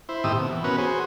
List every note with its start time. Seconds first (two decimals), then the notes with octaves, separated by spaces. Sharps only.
0.09 E4 C5
0.24 A2 D#3 C4 G4 D#6 E6
0.37 B2
0.51 E3
0.64 B3 C#4 F#4 A#4 B4
0.78 F#4 G#4 C5